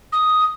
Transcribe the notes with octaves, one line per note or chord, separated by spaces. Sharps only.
D#6